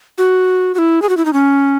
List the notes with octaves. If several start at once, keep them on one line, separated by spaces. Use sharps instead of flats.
F#4
F#4
E4
G#4
F#4
E4
D#4
C#4